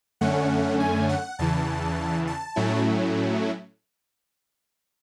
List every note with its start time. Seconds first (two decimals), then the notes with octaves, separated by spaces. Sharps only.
0.21 F#2 D3 A3 C#4 F#5
0.80 G#5
1.09 F#5
1.39 E2 C#3 E3 A5
2.27 A5
2.56 A2 F#3 A3 C#4 E4